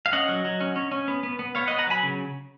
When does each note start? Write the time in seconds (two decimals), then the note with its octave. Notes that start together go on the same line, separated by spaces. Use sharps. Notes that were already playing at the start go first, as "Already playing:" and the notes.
0.06 F5
0.13 C#4 D#5 F#5
0.28 F#3
0.45 F#3
0.60 C#4
0.76 C#4
0.92 C#4
1.08 B3
1.23 B3
1.39 B3
1.55 B3 C#5 F5
1.67 B3 D#5 F#5
1.78 F#5 A#5
1.87 F#3 G#5 B5
2.03 C#3